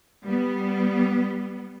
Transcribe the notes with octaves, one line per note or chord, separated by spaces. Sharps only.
G3 B3